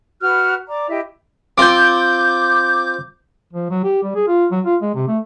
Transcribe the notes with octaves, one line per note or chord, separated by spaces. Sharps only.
F#4 B4 F6 F#6
D5 A#5 D6
E4 G4 D#5 E5
C4 F4 D6 G6
F3
F#3
G4
G3
G#4
F4
F#3
F4
G#3
C3
A3